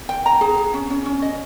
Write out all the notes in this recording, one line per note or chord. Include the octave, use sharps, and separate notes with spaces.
G5
A#5
G#4
G#4
C#4
C#4
C#4
D#5